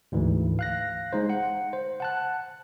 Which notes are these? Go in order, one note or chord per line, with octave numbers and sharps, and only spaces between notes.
D2 G#2 E3
F5 F#6 A#6
G#3 D#4 C5
F#5
C5
F#5 A5 F#6